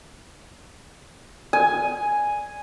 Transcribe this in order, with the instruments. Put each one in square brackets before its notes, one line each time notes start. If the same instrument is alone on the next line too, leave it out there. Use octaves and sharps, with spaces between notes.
[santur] G#5